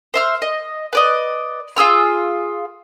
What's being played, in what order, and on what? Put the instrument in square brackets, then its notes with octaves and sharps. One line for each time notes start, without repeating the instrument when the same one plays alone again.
[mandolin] C5 E5 F6
D#5
B4 D5 D#5
F4 G#4 E6 F6